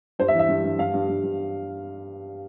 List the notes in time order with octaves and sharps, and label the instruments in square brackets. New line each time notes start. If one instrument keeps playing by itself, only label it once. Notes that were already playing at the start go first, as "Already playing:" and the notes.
[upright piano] G2 C5
E5
E3
E5
G2
G2
G2 F5
G2
G2
G2